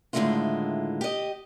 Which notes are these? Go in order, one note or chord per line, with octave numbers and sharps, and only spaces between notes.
A2 D3 D#3 G#3 E4 F4
G4 D#5